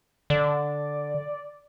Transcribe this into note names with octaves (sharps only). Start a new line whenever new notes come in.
D3 D5